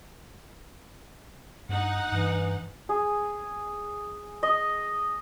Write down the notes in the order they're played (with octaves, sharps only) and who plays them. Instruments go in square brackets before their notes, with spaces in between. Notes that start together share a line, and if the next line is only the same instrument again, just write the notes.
[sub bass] G2 [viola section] D#4 F#5
[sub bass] G2 [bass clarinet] E3
[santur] G#4
D#5